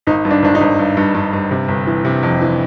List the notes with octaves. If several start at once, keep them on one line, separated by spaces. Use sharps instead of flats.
G#1 D#4
G2
D4
G#1 D4
D#4
G#1
G2
G2
G2
G2
C3
G1
E3
C3
F2
E3